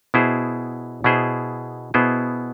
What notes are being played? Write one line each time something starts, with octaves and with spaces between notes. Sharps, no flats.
B2 B3 E4 G#4 C5
B2 B3 E4 G#4 C5
B2 B3 E4 G#4 C5